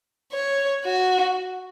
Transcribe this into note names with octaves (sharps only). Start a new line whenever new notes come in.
C#5
F#4